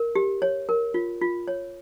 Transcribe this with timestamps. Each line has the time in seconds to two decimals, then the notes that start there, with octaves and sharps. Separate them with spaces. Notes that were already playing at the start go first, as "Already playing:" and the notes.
Already playing: A#4
0.15 G4
0.42 C#5
0.69 A#4
0.94 F4
1.21 F4
1.48 C#5